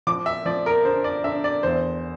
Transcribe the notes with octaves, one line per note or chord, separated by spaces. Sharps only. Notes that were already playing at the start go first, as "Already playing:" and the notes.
F3 D6
E5
F3 D5
A#4
D3 C5
D5
D3 E5
D5
E2 C5